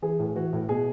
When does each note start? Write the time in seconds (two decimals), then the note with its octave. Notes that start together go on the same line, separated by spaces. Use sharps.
0.02 E3 G#4
0.19 A2
0.36 E3 F#4
0.53 A2
0.69 B2 G#4